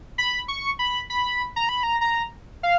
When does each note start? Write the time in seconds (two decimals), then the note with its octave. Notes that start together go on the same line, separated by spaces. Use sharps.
0.18 B5
0.48 C#6
0.79 B5
1.10 B5
1.56 A#5
1.69 B5
1.83 A#5
2.01 A#5
2.63 F5